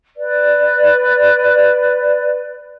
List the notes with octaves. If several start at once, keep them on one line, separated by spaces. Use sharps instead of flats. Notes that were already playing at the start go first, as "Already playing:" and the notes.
B4 D5